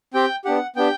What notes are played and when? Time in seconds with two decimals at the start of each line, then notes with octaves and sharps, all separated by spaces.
0.14 C4 G4 G5
0.45 B3 D4 G4 F#5
0.76 B3 D4 G4 G5